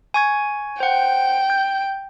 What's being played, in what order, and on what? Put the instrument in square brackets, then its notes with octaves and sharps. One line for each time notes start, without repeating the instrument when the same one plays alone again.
[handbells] G#5 C#6 G#6
[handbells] C5 F#5 [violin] G5
[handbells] G6